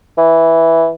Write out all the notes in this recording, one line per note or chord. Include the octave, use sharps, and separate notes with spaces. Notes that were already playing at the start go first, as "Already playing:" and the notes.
E3